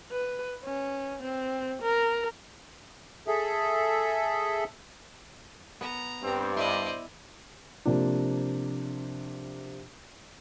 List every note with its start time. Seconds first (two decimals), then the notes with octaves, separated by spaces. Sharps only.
0.12 B4
0.64 C#4
1.22 C4
1.82 A#4
3.28 G#4 A4 E5
5.81 B3 A#5
6.23 G2 C4
6.57 E4 C5 D5 D#5
7.85 C3 F3 A#3 D4